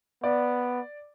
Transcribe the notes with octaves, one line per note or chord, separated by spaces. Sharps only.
B3 D5